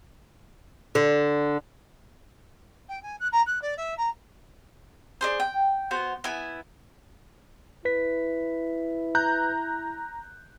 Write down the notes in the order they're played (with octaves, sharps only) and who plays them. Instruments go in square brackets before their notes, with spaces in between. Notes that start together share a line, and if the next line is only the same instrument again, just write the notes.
[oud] D3
[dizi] G5
G#5
F#6
A#5
F#6
D5
E5
A#5
[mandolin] D4 G#4 C5
G5
B3 F#4 C5
B3 E4 G#5
[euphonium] E4 [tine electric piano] B4 B6
[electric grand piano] A#5 F#6 G6